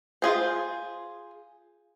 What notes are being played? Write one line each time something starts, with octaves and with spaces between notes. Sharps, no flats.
F4 G#4 C5